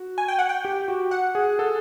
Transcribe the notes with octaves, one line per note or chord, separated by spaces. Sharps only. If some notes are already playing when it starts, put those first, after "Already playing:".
Already playing: F#4
G#5
G5
F#5
G5
G4
F#4
F#5
G#4
A4